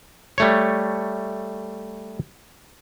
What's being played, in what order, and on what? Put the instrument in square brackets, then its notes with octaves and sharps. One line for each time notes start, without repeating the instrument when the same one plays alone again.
[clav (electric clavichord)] G3 A3 C#5